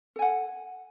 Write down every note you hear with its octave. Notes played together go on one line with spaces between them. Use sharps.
A4 F#5 G#5